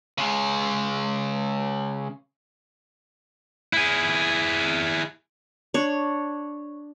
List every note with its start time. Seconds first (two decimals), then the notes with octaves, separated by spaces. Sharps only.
0.18 C#3 G#3
3.73 E4 G#4
5.74 D4 C#5